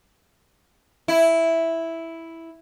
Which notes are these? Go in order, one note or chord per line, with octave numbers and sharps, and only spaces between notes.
E4